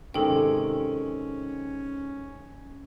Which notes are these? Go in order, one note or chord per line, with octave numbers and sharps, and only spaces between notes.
G#2 C3 D#3 C#4 A4 G5